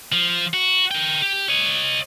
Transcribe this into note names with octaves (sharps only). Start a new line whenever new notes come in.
F3
F#4
A#4 G5
G4
C#5 D#5